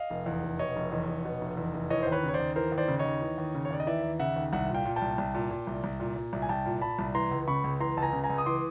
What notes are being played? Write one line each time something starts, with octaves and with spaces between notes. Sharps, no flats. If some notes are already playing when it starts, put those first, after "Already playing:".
Already playing: D#5 F5
F1
E2
F1
B2 C#5 D#5
F1
E2
F1
B2
F1
E2
F1
E3 C#5 D#5
D#2 C5
B4 C#5
C#3 C#5
C5 D5
D#2
E3 A#4 C5
D#2
C5 D5
C#3
C#5 D#5
D#2
E3
D#2
C#3
C#5
D#2 D5
D#5
E3 D5 E5
D#2
C#3 E5 F#5
D#2
C2 E5 F#5
A#2
F5 G5
A#2
G5 A5
C2
C2
A#2
A#2
C2
C2
A#2
A#2
C2
G#5
C2 G5 A5
A#2
A#2 A5 B5
C2
E3 A#5 C6
C#2
C#3 B5 C#6
C#2
E3 A#5 C6
C#2 A5
G#5 A#5
C#3
G#5 A#5
C#2
D#6
E3 C6 D6